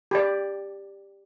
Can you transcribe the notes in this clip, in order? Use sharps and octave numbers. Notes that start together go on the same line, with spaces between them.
G4 D5